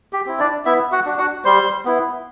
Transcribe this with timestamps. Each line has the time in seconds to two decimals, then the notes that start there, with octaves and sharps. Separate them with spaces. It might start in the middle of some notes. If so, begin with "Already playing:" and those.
0.13 G4
0.26 C4 E4
0.39 D4 D5
0.65 B3 E4 E5
0.92 F#4 F#5
1.06 D4 F#4
1.18 F#4 F#5
1.45 G3 C5 C6
1.85 B3 E4